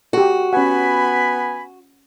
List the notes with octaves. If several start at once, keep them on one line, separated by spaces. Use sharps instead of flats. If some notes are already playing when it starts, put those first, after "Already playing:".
F#4 G4 A4
B3 C#4 F#5 G#5 B5